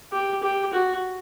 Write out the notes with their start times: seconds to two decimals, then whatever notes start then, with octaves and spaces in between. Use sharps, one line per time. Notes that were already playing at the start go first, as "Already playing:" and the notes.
0.12 G4
0.43 G4
0.73 F#4